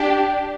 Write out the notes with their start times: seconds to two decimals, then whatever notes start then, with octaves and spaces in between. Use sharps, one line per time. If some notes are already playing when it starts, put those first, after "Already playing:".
Already playing: D4 G4